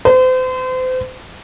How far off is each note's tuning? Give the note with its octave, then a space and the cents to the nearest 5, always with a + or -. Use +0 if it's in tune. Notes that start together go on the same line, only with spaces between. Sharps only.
C5 -35